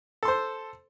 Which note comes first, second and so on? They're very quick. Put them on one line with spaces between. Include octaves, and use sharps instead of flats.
A4 C6 C5